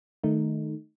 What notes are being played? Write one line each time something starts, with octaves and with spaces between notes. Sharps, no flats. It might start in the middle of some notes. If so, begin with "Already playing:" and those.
D#3 A3 D#4